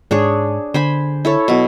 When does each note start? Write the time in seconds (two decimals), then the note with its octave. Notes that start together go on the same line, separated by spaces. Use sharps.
0.11 G#2 D4 G#4 C#5
0.74 D3 C5 G#5 B5
1.25 E4 A4 C#5
1.48 B2 F#3